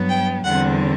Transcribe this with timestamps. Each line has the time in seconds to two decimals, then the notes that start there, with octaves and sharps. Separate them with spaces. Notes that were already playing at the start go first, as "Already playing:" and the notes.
Already playing: G2 F#3 B3
0.10 G5
0.44 E2 D3 G3 C4 F#5